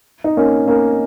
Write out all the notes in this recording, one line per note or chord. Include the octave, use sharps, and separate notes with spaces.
D#4
A#3 C#4
A#3 C#4